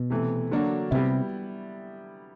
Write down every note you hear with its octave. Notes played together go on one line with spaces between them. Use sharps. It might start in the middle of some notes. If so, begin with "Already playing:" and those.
Already playing: B2
C3 E3 A3
D3 F#3 A#3 D4 F#4
C3 G3 B3 E4